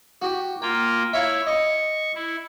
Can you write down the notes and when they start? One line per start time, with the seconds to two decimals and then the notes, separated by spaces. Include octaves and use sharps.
0.22 F#4 G4
0.62 A#3 F4 G5
1.13 E4 C#5 E5 F5
1.47 D#5 C#6
2.15 E4